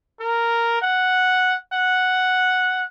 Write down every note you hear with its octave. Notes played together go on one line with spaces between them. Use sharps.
A#4
F#5
F#5